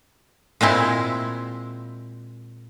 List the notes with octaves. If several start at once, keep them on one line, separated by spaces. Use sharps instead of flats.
A#2 G#3 C4 E4